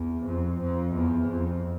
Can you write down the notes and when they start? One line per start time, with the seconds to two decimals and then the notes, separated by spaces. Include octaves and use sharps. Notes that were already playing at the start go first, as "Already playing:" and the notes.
Already playing: E2
0.26 F2
0.60 F2
0.94 E2
1.28 F2